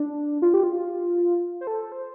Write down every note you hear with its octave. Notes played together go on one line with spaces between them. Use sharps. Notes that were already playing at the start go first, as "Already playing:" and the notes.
Already playing: D4
F4
G4
F4
C5
A4
C5